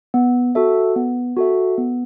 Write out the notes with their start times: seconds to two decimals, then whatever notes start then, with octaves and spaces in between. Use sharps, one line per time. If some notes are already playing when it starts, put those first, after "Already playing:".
0.14 B3
0.55 F#4 A4 E5
0.96 B3
1.37 F#4 A4 E5
1.78 B3